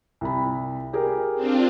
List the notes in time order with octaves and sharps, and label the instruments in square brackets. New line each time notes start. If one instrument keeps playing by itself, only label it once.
[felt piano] C2 B5
G4 G#4 A#4
[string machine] C4 D4 F4